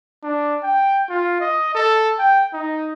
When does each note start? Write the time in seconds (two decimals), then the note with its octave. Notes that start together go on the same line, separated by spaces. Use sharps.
0.23 D4
0.63 G5
1.09 F4
1.41 D#5
1.75 A4
2.19 G5
2.54 D#4